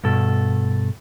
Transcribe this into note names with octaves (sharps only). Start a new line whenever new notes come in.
G2 B2 A4